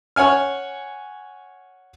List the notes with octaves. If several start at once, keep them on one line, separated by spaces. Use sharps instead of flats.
C#5 F#5 G#5 F6